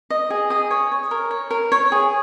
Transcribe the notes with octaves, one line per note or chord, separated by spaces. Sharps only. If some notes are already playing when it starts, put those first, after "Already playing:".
D#5
G#4
G#4 D#6
C#5
C#5
A#4
C#5
A#4
C#5
G#4